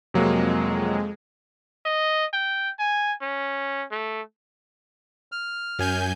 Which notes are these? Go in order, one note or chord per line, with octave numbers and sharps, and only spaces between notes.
F2 C3 F#3 G#3 A#3
D#5
G5
G#5
C#4
A3
F6
F#2 G#5 G6